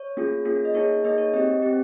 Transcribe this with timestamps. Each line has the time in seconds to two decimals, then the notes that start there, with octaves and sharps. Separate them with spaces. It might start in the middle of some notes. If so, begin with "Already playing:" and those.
Already playing: C#5
0.17 A#3 C#4 F4 G#4
0.45 A#3 C#4 F4 G#4
0.65 D#5
0.74 A#3 D#4 G#4 C#5
1.04 A#3 D#4 G#4 D#5
1.18 C#5
1.34 C4 G4 D#5
1.62 C4 G4